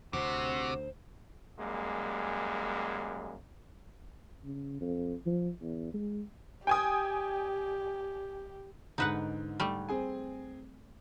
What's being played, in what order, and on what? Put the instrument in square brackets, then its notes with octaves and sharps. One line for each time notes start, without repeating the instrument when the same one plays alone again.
[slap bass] D2 [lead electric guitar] C3 [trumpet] F#4 [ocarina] C5
[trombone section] F#2 G3 G#3 A#3
[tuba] C#3
F2
F3
E2
G#3
[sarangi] G4 [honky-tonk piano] G5 G#5 D#6
[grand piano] G#2 D3 [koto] D#4 B4 F#5
[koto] G3 A3
[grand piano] C4 G#4 G#5